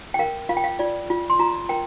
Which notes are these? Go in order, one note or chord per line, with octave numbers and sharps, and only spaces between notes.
G5
A#4 F5
F4 F5
G5
F5
F4 D5
F4
C6
F4 A#5
A#4 G5